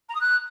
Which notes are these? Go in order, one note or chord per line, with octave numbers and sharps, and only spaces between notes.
A#5
D#6
F#6